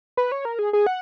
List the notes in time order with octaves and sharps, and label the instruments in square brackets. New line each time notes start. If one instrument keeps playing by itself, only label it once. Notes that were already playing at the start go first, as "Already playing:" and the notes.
[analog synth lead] B4
C#5
A#4
G#4
G#4
F#5